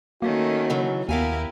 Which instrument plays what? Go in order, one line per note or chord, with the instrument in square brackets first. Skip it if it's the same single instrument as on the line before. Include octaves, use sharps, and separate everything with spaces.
[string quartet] D#3 A3 C#4 [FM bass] A#3 [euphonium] F#4
[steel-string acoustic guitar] C#3 E3 F#3
[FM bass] D#2 [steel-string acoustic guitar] B3 F5 G#5 [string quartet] E4 G4 A#4